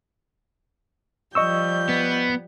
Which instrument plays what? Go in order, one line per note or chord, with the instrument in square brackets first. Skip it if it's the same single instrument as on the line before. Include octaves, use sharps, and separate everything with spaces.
[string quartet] F3 G3 G6 [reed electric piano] D#5 C#6 E6
[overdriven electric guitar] B3